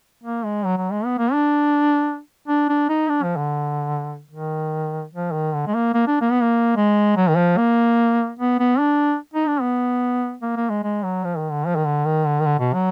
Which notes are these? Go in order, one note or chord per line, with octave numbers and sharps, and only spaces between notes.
A#3
G#3
F#3
F#3
G#3
B3
A#3
D4
D4
D4
D#4
D4
F3
D3
D#3
F3
D#3
D3
G#3
A#3
A#3
D4
A#3
B3
A#3
G#3
F#3
D#3
F3
A#3
B3
B3
D4
D#4
D4
B3
A#3
A#3
G#3
G#3
F#3
F3
D#3
D3
F3
D#3
D3
D#3
D3
D#3
D3
B2
F#3